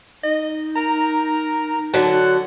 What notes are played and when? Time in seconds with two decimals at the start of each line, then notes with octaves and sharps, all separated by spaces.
0.24 D#4 D#5
0.76 A#4 A#5
1.94 D3 F#3 F#5 A5